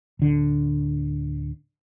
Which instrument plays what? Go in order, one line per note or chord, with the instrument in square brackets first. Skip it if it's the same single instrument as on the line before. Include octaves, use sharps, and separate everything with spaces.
[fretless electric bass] D1 D3